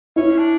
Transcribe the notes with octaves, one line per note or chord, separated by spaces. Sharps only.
C#4 E4
D4